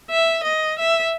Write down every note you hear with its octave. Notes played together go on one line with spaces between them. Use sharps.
E5
D#5
E5